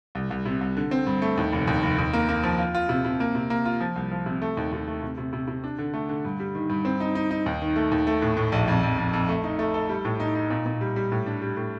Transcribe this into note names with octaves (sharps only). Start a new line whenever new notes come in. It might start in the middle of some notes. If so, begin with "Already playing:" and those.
C2
C2
C3
C2
D3
C4
G2
A3
D#2
F1
D#2
F1
D#2
A#3
A#3
F3
F4
F4
C3
C3
A#3
C3
A#3
F4
F3
C2
F3
C3
A3
D#2
D#2
A3
C3
C3
C3
C3
D4
D3
A3
D3
G2
G3
D#3
G2
C4
D#4
D#4
D#4
D#2
D#3
A3
D#2
A3
A2
A2
A#1
F2
F2
F2
F2
A3
D#4
A3
A4
G3
A2
D#4
D#4
A#2
A#2
G3
G3
A2
D4
G3
A2